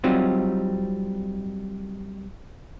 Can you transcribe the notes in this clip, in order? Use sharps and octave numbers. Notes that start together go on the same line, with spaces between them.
F#3 G3 C4 D#4 F4